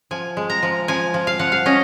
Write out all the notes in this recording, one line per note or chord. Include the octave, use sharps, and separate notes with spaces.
F3 G#5
G#3
A#5
F3
F3 G#5
F3
F5
F3 F#5
F5
C#4 D#5